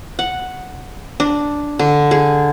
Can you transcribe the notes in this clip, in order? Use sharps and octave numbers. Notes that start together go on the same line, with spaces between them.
F#5
D4
D3
G#4